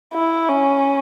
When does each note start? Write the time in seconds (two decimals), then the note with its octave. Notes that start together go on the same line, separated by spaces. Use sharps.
0.14 E4
0.49 C#4